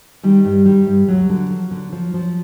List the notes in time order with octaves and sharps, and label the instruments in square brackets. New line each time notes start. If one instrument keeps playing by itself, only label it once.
[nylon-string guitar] D#3 G3
G2
D#3 G3
G2
D2 F#3
D3
F3
D3
F3
F3